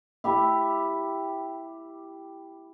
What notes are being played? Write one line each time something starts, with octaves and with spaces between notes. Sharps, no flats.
E4 G4 E5